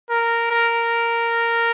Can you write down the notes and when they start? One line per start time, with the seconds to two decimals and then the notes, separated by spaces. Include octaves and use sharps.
0.09 A#4
0.51 A#4